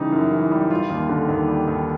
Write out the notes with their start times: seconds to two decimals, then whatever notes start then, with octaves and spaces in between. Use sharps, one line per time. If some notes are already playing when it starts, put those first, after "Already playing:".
Already playing: C#3 E3 G3 D#4
0.12 F#2
0.32 E3
0.51 G3
0.71 G3 F4
0.90 D#2
1.09 D3
1.29 D#2
1.48 G3
1.67 D#2